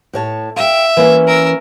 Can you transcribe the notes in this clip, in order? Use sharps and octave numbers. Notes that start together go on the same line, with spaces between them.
A2 C#5 A5
E5 F5 G5
E3 A#3 C#4
A#4 E6